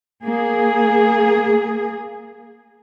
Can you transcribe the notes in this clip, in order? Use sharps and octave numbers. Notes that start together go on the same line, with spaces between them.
A#3 G#4